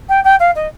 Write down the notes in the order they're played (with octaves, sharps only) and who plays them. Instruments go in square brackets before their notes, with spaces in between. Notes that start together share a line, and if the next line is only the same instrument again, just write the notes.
[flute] G5
G5
F5
D#5